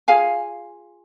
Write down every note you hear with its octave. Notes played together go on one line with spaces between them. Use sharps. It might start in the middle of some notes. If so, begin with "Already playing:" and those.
F4 G#4 F5 G#5